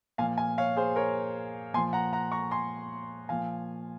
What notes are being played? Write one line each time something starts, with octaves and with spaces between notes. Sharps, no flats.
A#2 F3 F5 G#5
F5 G#5
C#5 F5
G#4 C5
A#4 C#5
A#2 F3 G#5 C6
F#5 A#5
F#5 A#5
A#5 C#6
G#5 C6
A#2 F3 F5 G#5